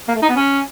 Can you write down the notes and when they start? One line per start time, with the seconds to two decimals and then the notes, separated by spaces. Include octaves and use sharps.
0.08 A#3
0.15 A3
0.22 D#4
0.29 B3
0.36 C#4